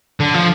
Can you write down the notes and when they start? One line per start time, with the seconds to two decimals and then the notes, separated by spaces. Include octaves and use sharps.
0.20 D3
0.34 F3